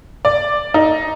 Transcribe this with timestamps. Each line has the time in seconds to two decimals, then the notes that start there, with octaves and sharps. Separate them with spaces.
0.25 D5
0.74 D#4